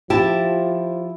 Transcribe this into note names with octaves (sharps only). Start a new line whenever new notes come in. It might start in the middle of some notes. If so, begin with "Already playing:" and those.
F3 E4 G4 A5